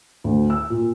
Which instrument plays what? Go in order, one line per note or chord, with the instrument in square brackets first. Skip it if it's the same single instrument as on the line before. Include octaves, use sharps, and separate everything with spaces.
[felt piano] D2
E6
A#2